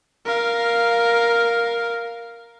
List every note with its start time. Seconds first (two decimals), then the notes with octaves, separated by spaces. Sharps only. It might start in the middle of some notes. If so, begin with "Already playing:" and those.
0.25 A#4 F5